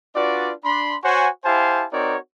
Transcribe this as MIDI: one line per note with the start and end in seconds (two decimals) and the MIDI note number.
0.16 0.53 62
0.16 0.53 65
0.16 0.53 66
0.16 0.53 71
0.16 0.53 74
0.65 0.96 62
0.65 0.96 83
0.65 0.96 84
1.04 1.28 66
1.04 1.28 72
1.04 1.28 73
1.04 1.28 78
1.04 1.28 80
1.45 1.85 64
1.45 1.85 67
1.45 1.85 72
1.45 1.85 77
1.45 1.85 80
1.45 1.85 81
1.92 2.17 60
1.92 2.17 63
1.92 2.17 66
1.92 2.17 70
1.92 2.17 73
1.92 2.17 74